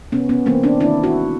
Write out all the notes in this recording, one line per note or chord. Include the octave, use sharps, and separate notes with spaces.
C3 B3 C#4
B3 C#4
E3 G#3 A#3 C4
C4 D4
D#3 D4 E4
E4 F#4
G#3